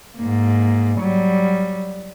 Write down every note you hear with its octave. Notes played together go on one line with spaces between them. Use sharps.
G#2 A#3
F#3 G3